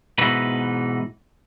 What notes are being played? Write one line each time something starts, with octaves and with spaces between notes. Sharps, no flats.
G#2 B2 E3 D#4 B4